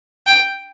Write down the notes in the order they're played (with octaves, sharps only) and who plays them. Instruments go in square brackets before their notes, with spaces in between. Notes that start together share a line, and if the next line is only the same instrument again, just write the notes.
[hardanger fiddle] G5